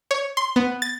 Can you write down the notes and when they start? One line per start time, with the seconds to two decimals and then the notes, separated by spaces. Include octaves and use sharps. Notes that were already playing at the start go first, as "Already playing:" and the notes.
0.11 C#5
0.37 C6
0.56 B3
0.82 A6